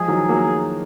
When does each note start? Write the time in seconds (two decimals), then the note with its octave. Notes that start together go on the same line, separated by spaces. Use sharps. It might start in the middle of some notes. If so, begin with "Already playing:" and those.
Already playing: F3 G#3 G#4
0.08 D#3 F#3
0.29 F#3 A#3